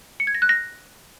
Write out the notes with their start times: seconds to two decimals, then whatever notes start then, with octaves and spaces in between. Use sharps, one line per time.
0.20 C#7
0.27 G#6
0.35 A#6
0.42 F#6
0.49 A#6